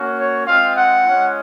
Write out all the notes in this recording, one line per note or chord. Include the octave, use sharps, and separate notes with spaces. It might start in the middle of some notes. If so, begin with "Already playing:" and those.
Already playing: A#3 C#4 F#4
C#5
G#3 C4 F4 F5
F#5
G#3 C#4 F4